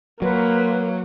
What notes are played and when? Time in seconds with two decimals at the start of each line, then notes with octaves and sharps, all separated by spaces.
0.22 F#3 A#3 B4 C6